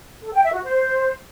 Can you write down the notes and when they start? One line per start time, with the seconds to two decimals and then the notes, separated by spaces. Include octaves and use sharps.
0.23 A4
0.33 G5
0.44 E5
0.54 F#4
0.64 C5